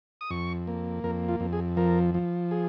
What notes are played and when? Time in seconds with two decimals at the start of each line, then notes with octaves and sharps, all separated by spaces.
0.21 D#6
0.30 F2 C#6
0.67 A#3
1.04 F2 A#4
1.29 F4
1.40 F2
1.53 G#4
1.77 F3 A#4
2.14 F3
2.51 G#4